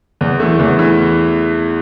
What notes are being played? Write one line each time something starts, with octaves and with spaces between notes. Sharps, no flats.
E2
E3 A3
E2
E3